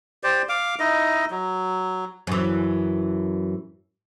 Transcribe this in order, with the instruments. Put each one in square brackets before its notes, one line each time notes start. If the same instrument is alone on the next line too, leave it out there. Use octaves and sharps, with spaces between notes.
[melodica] G4 C5 D5
F5 D6
D#4 E4 D#5
F#3
[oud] F#2 E3